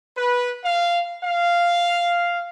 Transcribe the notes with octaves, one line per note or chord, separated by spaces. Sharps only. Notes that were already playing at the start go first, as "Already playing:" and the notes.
B4
F5
F5